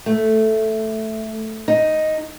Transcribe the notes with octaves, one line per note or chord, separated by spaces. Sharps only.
A3
D#4